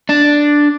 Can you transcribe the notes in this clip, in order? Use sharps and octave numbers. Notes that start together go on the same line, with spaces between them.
D4